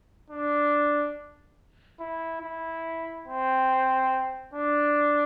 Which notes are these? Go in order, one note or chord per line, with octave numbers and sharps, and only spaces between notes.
D4
E4
E4
C4
D4